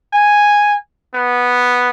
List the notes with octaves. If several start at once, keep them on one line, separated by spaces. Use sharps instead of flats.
G#5
B3